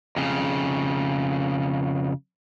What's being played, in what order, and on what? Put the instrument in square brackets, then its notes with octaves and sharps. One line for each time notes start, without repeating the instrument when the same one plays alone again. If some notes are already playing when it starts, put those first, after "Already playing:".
[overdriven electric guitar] F2 C#3